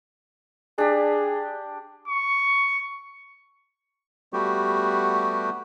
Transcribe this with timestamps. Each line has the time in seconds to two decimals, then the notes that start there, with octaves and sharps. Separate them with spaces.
0.78 D4 G4 G#4
2.08 C#6
4.33 G3 A3 B3 F#4 G4